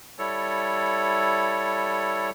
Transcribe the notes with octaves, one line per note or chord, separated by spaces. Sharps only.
G3 E4 A4 C#5